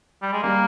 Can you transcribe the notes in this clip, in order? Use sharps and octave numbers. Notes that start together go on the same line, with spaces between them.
G3
G#3
G3 A#3